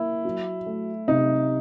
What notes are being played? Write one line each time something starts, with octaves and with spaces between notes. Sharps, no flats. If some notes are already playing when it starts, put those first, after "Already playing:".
Already playing: A#3 E4
F#3
A3
C3 D#4